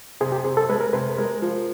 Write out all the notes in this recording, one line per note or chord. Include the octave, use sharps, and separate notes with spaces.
C3 G#4
G4
C3 G#4
A4
G#3 B4
A#4
C3 B4
G#3 A#4
F3